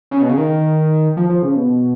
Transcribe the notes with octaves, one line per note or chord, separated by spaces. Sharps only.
C#3
B2
C#3
D#3
F3
F3
C#3
B2